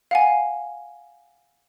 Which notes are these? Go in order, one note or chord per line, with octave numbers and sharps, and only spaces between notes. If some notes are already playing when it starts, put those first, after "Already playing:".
F5 F#5 G#5